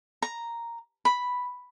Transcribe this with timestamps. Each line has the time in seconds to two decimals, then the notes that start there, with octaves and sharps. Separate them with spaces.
0.22 A#5
1.05 B5